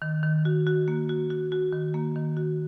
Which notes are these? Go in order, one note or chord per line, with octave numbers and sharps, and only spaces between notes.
D#3
D#3
F#4
F#4
A#3
F#4
F#4
F#4
D#3
A#3
D#3
F#4